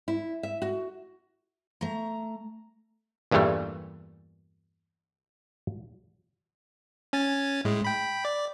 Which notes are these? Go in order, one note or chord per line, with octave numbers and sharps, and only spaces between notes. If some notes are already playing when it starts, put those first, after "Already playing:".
E4
E5
F#4
A3 A#5
E2 G2 A#2 E3 G3 A3
C#4 G#5 A6
A2 G#3
G5 B5
D5